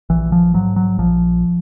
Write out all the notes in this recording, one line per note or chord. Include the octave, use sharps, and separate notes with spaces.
A#1 E3
F3
G#2 F#3
F#3
A#1 F3